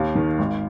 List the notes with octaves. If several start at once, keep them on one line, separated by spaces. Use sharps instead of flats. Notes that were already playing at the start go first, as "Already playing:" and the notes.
Already playing: D#2 F5
D#3
G#1